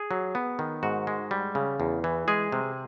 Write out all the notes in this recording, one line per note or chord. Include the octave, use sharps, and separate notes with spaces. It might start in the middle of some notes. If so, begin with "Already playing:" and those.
Already playing: G#4
F#3
B3
D#3
G#2 F#4
G#3
G3
C#3
E2
E3
G#3 G#4
C3